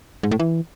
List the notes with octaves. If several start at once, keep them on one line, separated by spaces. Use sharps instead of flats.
G#2
A2
E3